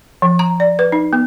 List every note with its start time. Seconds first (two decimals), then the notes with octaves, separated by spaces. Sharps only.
0.22 F3
0.39 A#5
0.60 D5
0.79 B4
0.92 D#4
1.13 B3